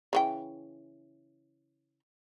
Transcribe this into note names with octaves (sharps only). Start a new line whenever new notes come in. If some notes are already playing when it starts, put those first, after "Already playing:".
C#3 E3 G5